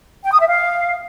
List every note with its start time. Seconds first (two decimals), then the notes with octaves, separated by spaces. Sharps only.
0.24 G5
0.32 D#6
0.40 E5
0.48 F5